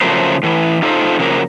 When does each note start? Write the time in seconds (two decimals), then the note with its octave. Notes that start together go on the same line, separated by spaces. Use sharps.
0.01 C#3 F3 F#3 A3 A#4 C5
0.43 A2 E3
0.82 D#4 F4 A4 C5
1.19 C#3 F3 F#3 A#3 A#4